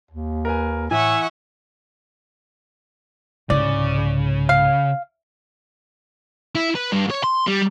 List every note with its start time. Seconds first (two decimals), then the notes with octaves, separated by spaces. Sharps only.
0.11 D#2
0.45 A#4 B4 G#5
0.91 A2 E3 E5 F#5 G#5 C#6
3.50 C2 G#2 C#3 D5
4.49 F5
6.55 E4
6.75 B4
6.92 G2
7.10 C#5
7.24 C6
7.48 G3